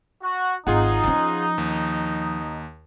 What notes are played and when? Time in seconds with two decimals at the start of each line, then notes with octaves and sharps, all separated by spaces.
0.21 F#4
0.67 G#1 D#4 F4 G#4 F#5
1.04 F3 C#4
1.58 D#2